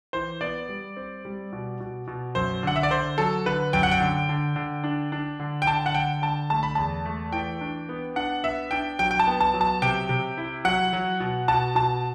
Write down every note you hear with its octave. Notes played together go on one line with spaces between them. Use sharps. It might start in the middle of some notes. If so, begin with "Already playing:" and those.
E3 C5
B3 D5
G3
C4
G3
B2
B2
B2
F#2 C5
D3 F#5
E5
D5
D3 C5
F#3 A4
D3 B4
F#2 G5
F#5
G5
D3
D3
D3
D4
D4
D3
G5
D3 A5
F#5
D3 G5
D3 A5
A3 A5
B5
E2 A5
A3
E3 G5
D4
B3
D4 F#5
B3 E5
D4 G5
F#3 G5
G5
A5
B3
A5
F#3
A5
C3 G5
C3
E4
F#3 F#5
F#3
B2
B2 A5
B2 A5